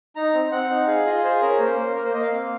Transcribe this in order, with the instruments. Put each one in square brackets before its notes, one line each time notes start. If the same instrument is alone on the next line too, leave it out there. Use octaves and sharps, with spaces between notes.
[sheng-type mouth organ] D#4 A#5
C4
C4 F#5
D#4
G#4 F5
F4 D#5
G#4 C5
C#4 A#4
A#3 C5
A#3
A#3 A#4
C5
A#3 D#5
F5
C4